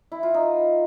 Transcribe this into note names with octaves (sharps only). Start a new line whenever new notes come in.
E4
F4
D#4